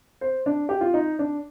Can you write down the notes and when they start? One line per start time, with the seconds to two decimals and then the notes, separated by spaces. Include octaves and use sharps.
0.21 C5
0.46 D4
0.69 G4
0.81 F4
0.94 D#4
1.19 D4